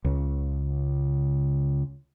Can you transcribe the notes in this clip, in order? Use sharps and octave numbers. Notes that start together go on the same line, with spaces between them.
C#2 C#3